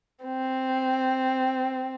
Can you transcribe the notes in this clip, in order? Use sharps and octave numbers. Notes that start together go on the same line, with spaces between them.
C4